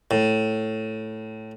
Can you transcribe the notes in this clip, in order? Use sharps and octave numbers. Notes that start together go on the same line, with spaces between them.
A2